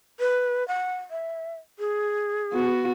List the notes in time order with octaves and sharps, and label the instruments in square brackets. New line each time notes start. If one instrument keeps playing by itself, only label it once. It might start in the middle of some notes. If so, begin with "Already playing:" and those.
[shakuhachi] B4
F#5
E5
G#4
[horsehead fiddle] B3 F#4